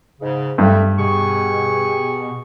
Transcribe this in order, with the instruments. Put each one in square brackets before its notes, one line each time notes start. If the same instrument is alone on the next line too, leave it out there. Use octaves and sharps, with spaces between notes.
[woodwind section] G#2 C#3
[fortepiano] G2 [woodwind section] A3
[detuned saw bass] B2 [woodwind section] G4 G#4 C#6